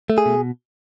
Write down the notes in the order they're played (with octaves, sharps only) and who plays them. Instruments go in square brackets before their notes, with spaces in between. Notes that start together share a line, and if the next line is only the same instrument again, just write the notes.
[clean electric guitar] A3
G#4
B2